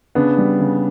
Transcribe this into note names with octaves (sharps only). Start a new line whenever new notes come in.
C#3 B3 D4
G3
C#3